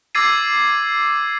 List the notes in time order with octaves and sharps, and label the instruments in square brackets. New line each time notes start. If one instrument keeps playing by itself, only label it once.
[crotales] D6 E6 G#6 A6 C7 D#7